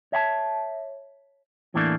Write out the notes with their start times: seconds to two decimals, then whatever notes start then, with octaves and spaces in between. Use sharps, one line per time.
0.12 C#5 E5 F#5 A5
1.74 E2 A2 E3 A3 A#3 D4